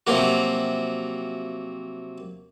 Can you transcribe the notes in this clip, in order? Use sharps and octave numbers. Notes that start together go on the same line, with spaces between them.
C3 F3 F#3 A#3 F#4